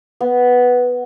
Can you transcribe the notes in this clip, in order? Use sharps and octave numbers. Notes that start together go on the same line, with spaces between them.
B3